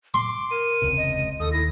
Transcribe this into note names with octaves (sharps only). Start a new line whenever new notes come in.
C6 D6
A#4 D#7
E1 C#2 C3
D#5
D#2 A4 D#6
E4 A#6